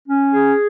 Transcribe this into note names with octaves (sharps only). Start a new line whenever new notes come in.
C#4
G#4